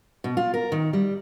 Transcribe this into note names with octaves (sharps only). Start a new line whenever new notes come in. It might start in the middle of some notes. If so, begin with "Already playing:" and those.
B2
F4
A#4
D#3
G3